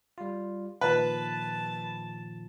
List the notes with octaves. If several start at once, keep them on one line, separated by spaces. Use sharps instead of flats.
G3 F4
A#2 D#3 F3 B4 A5